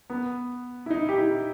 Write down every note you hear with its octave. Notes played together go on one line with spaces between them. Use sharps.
B3
E4
D#4
G4
E4